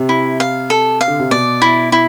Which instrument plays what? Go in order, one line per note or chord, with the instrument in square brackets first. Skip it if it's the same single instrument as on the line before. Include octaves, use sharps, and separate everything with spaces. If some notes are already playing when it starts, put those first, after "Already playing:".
Already playing: [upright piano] C3
[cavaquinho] E4
F5
A4
F5
[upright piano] D3
C3
[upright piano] B2 [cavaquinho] D5
[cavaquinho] E4
E4